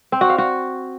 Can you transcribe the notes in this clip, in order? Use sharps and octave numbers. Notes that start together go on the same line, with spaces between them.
C4
F#4
F5
F#4